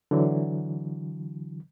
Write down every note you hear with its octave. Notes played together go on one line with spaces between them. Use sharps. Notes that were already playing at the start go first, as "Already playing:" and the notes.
D3 E3 F#3